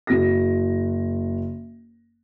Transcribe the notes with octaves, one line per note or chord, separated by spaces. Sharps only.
F#1 F#4 A#6